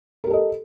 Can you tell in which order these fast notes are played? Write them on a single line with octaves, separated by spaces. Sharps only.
A#4 G4 A4 D#5